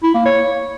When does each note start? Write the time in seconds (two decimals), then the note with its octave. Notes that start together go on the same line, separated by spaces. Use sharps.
0.03 E4
0.14 A#3
0.26 C#5